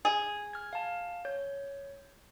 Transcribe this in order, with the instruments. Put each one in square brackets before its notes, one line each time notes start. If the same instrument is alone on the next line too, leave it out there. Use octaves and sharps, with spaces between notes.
[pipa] G#4
[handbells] F6 G#6
F5 A5
C#5 G6